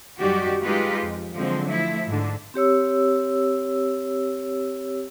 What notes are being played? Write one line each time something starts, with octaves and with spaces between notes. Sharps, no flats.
F#2 D#3 G3 F#4 G4 D5
G#3 D#4 F4 G4 B4
F2
D3 F3 F#3 G#3 C4
F3 A3 E4
G#2 D3
C4 G4 C#5 E6